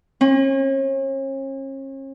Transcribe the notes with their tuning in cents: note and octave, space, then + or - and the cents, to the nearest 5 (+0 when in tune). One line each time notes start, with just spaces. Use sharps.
C#4 -40